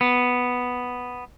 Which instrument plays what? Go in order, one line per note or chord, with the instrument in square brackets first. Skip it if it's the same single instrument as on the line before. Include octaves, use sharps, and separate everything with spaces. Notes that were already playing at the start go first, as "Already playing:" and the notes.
[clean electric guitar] B3